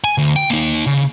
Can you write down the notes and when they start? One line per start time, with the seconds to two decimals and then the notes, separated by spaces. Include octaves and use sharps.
0.04 G#5
0.18 D2
0.36 G5
0.50 A#3 D#4
0.87 C#3